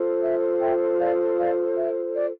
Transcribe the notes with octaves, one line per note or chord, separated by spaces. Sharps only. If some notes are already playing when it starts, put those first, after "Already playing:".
Already playing: F4 A4 C5
E5
E5 G5
D5 F5
D5 F5
E5
D5